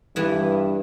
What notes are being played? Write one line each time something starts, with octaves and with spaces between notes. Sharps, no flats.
G2 E3 B3 E4